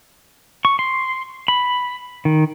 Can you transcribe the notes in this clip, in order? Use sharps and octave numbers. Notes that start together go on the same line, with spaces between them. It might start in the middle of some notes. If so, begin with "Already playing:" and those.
C#6
C6
B5
D#3